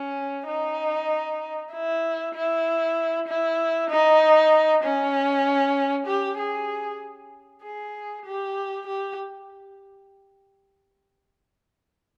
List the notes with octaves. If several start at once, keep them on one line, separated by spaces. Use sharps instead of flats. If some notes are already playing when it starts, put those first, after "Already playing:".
Already playing: C#4
D#4
E4
E4
E4
D#4
C#4
G4
G#4
G#4
G4
G4